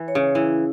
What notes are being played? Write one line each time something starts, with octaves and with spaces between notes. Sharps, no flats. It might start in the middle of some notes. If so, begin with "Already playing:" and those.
Already playing: E3
C#5
C#3
E3 E4